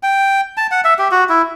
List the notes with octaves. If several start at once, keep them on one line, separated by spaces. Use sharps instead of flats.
G5
A5
F#5
E5
G4
F#4
E4